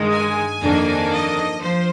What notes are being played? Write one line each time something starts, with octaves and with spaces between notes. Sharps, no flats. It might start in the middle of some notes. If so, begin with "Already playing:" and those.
Already playing: G2 D#3 G#3
G#5
F2 D#3 A#3 D4
D#5
F3 C5